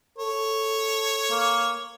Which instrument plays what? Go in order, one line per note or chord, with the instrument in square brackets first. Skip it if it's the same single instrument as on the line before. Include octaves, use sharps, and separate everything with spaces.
[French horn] A4 [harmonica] C#5
[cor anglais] A#3